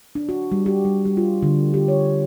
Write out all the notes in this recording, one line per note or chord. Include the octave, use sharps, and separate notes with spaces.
D4
F#4
G3
G4
G3
G3
F4
D3
G4
C#5